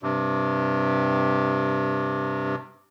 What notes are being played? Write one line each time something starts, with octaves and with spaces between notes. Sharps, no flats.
G2 C3